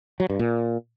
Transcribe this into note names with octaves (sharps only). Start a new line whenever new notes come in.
F#3
G2
A#2